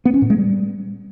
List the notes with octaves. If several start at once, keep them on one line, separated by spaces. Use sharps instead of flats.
B3
C#4
A2
G#3
G3